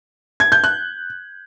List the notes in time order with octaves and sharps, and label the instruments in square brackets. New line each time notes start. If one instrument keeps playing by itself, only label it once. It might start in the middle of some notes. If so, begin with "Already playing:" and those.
[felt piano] G#6
G6
F#6